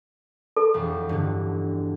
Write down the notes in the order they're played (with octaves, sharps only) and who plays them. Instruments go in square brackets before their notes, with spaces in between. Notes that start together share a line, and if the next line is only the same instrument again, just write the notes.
[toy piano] A4
[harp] E1 F2
G2 D3